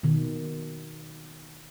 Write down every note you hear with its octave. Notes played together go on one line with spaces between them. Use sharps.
B2 D#3